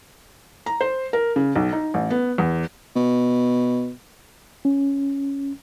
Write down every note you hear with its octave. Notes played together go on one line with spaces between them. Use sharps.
A#5
C5
A#4
C#3
B1
D#4
A1
B3
E2
B2
C#4